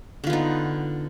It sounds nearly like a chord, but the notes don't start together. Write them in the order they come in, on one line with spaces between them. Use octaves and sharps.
D3 F4 B3 D#4